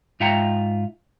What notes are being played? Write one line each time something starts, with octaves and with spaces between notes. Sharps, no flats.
G#2 F4 E5 F#5 G5 A#5